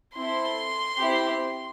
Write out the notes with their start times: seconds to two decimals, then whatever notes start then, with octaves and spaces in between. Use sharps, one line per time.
0.16 C4 E4 A4 C6
1.00 C4 E4 G4